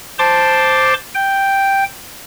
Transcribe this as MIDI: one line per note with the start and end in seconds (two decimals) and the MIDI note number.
0.19 0.94 72
0.19 0.94 81
0.19 0.94 84
0.19 0.94 86
1.15 1.84 79